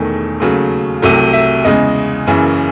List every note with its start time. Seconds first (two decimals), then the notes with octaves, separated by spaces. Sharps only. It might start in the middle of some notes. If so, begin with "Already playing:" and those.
Already playing: E1 E2 D#3 A3
0.40 D#2 C#3 F#3 A3
1.02 C2 C3 F#3 A3
1.33 E5
1.64 E2 C#3 G#3 D#5
2.27 F#1 F#2 C#3 E3